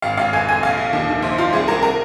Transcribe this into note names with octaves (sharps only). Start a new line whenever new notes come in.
G#1 F5
G#1 F5
F1 G#5
F1 G#5
A#1 F5
A#1
D#2
D#3
A#1 C5
A#1 F4
C2 G#4
C2 A#4
A#4